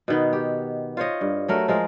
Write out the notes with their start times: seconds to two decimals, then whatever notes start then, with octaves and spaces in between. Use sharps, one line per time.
0.08 B2 D#3 B3
0.33 G4
0.97 F4 C5 C#5 D#5
1.21 G2
1.48 F#3 A3 A#4
1.68 F3 G#3 A#4